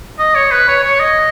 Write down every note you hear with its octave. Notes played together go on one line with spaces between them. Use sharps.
D#5
C#5
B4
C#5
C#5
D#5